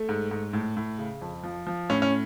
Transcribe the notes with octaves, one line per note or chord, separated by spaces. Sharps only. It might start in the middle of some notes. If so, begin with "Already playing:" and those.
Already playing: A3
G#2
G#2
A2
A2
C#3
F2
F3
F3
A2 C#4
C#4